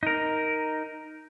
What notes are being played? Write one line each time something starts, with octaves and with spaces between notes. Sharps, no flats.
D#4 A#4